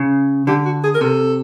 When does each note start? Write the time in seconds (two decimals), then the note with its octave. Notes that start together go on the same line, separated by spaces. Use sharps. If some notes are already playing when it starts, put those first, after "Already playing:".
Already playing: C#3
0.47 D3 G4
0.65 F#4
0.83 G#4
0.95 A#4
1.01 C3 A4